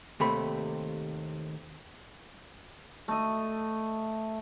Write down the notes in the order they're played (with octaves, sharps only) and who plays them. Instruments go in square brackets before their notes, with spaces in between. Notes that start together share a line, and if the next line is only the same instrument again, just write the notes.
[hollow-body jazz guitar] D#2 C3 A3 B5
[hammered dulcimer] A3 D#5